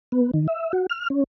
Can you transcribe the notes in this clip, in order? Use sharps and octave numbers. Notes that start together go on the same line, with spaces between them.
B3
D#3
E5
F#4
F6
C#4